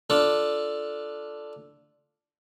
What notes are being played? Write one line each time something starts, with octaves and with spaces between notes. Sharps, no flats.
D4 F4 A4